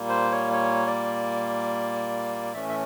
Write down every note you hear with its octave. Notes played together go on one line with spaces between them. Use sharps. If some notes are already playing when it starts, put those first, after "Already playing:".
Already playing: A#2 G3 A#3
C5
C#5
C#5
D5
A2 E3 A3 C#4 E5
E5